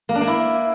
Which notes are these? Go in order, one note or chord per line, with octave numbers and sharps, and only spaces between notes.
A#3
D4
A#3
E4